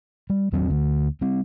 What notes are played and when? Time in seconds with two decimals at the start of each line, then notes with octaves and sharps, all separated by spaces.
0.30 G3
0.52 E2 D#3 F#3 C4
0.69 D2 D3
1.21 G3 C4